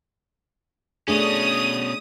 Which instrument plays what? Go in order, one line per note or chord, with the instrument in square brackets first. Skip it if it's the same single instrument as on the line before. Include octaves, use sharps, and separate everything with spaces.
[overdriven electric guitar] B2 C#4 [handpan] A3 D4 G#4 [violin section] D#6